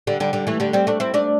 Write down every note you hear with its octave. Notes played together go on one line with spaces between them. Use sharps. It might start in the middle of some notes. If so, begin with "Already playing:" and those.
D3 G3
D3 G3
D3 G3
E3 A3
D3 G3
G3 C4
A3 D4
C4 E4
A3 D4